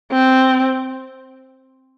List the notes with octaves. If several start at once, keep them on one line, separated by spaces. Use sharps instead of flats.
C4